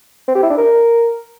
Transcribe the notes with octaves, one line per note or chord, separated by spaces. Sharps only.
C4
G4
E4
D4
A#4